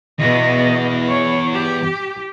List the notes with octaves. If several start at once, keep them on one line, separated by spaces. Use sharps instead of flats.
E2 B2 B3 D#5
C#5
G4